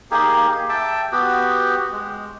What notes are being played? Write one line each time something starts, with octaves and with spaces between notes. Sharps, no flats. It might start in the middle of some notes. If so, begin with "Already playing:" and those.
A#3 D#4 G4 G#4
E5 G5 A5
B3 F#4 G4
G#3